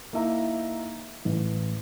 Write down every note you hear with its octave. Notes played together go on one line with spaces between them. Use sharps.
A#3 D#4 E4 E5 A#5
A1